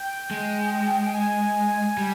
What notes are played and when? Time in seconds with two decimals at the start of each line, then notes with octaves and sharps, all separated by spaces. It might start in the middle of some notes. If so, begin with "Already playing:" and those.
Already playing: G5
0.31 G#3
1.03 G5
1.14 G#5
1.98 G3